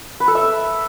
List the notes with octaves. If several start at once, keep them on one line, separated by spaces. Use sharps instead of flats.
B4
A4
E5